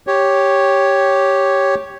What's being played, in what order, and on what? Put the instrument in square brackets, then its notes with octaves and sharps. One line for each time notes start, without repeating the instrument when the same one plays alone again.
[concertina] G4 C#5